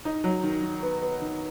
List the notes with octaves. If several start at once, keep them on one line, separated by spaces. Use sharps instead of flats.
D#4
F#3
D#3
D#3
B3
B3
D#3